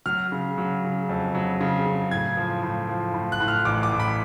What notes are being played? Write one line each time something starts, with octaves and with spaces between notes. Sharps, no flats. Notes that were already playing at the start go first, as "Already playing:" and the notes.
F#3 F6
C#3
F#3
C#3
F2
F#3
C#3
C#3
A2 G#6
F3
A2
F3
A2
F#6
A2
F6
A1 D6
D6
A2
B5